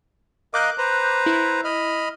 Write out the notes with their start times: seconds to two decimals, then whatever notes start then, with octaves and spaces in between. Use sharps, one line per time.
0.54 A#4 D#5 F5 D6 F#6 G6
0.78 B4 C5 A#5
1.26 E4
1.64 D#5 B5 F6